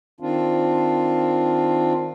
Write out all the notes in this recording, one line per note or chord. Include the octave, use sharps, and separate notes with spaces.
D#3 C4 D4 F4